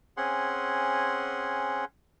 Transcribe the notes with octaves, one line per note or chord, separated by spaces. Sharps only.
C4 C#4 G#4 F#5 C6